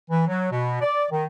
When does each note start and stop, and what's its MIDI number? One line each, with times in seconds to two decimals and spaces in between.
0.11 0.23 52
0.28 0.51 54
0.52 0.81 47
0.82 1.06 74
1.11 1.25 51